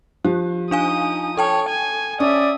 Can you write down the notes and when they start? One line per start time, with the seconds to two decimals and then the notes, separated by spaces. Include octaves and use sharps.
0.24 F3 G4
0.71 D4 D#4 F5 G#5 D#6
1.37 A4 C#5 G5 A5
1.69 G#5
2.20 C#4 D5 E5 D#6